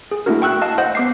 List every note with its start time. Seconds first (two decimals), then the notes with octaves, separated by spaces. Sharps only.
0.11 G#4
0.26 A3 A#3 D4 E4 F#4 A#4
0.42 G5 C#6 E6 F#6
0.62 D#5 F5 A5
0.78 C5 D#5 F#5
0.95 B3 D6 C7